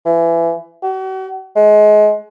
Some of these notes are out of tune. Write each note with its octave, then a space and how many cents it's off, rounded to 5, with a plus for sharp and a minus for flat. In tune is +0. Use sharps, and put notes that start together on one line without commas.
E3 +25
F#4 +40
G#3 +25